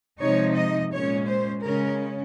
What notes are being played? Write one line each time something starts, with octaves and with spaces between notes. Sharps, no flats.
C3 F3 G#3 D#4 C#5
D#5
A#2 G#3 C#4 C#5
C5
C#3 G#3 C#4 A#4